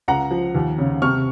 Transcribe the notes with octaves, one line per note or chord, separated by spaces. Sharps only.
C#2 F#5 A#5
F3
D#2
C#3
C3 C#6 F6